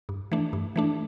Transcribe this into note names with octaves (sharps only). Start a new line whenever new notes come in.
G2
E3 A3 D4
G2
E3 A3 D4